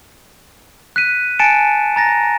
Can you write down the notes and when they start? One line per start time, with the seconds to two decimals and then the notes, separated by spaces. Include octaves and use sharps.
0.96 F#6 B6 D#7
1.39 G#5 A5 A6 C#7 D7 E7
1.96 A#5 A6 A#6